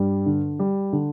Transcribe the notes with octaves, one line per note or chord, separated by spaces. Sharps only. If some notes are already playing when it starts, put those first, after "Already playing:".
Already playing: G2 G3
D3
G3
D3